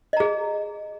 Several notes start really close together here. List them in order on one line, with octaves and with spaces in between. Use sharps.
D#5 A#5 G#4